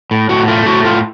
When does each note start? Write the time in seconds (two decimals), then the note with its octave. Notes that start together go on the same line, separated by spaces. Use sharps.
0.11 A2
0.29 A2 F#4
0.48 A3 F4
0.66 A2 F#4
0.85 A2 F4